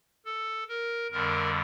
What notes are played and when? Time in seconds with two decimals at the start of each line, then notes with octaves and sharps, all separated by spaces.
0.26 A4
0.69 A#4
1.11 F2 D3 G3 A#4